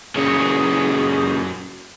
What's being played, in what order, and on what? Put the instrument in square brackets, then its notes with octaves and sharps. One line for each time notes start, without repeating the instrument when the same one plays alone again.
[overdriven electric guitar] F#2 C#5 [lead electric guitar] A#2 C#3 [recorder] G#4